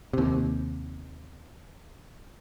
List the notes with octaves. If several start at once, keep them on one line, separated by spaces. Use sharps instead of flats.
D#2 C3